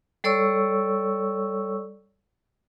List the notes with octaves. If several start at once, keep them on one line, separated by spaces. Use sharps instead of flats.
G3 A4 C#5 D5 C#6 E6